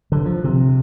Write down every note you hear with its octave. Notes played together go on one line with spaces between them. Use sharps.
D3
F3
C3